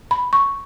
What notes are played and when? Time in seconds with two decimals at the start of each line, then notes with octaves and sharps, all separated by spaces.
0.11 B5
0.33 C#6